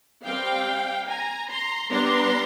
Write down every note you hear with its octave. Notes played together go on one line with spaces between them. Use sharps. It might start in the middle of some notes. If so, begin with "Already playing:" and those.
G3 C4 F5 G5
G#5 A#5
A#5 C6
G3 B3 D4 A#5 C6